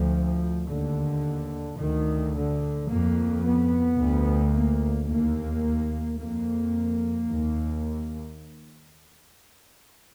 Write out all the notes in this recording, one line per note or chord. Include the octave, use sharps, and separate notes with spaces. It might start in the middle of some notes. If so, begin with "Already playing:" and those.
Already playing: D2 F3
D#2 D3
D2 D#3
D3
F2 A#3
B3
D2
A#3
D#2 A#3
F2 A#3
D#2